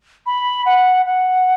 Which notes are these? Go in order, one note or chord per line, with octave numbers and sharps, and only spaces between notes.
B5
F#5
F#5